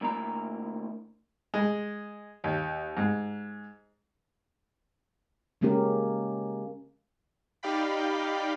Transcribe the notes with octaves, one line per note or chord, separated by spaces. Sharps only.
D2 A#3 E4 A#5
G#3
D#2
G#2
C#3 G#3 A#3 C#4 G4 A#4
D#4 G4 D5 F5 G5 B5